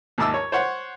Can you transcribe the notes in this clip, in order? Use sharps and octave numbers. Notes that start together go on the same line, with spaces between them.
D#2 G#2 A5 D6 E6
C#5
C5 C#5 F#5